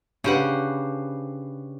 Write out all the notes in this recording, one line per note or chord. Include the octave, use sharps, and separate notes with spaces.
C#3 D4 G4 B4 C5 F#5